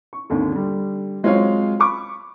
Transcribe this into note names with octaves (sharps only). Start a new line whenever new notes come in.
C#6
G#1 D#2 D3
D3 G3
F#3 G#3 C4 F4 C#5 F5
B5 C#6 D6